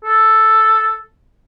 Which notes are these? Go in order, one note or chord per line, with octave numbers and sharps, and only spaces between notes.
A4